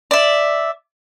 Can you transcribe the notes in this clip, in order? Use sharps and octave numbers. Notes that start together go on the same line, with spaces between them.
D5 E5